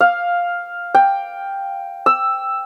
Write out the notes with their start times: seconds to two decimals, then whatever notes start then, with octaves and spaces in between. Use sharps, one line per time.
0.01 F5
0.95 G5
2.06 E6